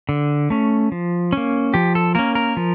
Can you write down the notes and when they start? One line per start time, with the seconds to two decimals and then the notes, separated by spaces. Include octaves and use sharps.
0.09 D3
0.50 A3 C#4
0.92 F3
1.33 A#3 C#4
1.74 F3 G4
1.95 A4
2.15 A#3 C#4 A#4
2.35 A#4
2.57 F3